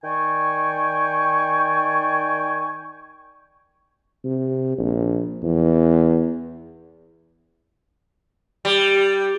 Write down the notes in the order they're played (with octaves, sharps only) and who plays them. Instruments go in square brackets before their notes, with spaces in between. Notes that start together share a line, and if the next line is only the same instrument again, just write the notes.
[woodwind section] D#3 D5 G5 G#5 C#6
[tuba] C3
A#1
E2
[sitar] G3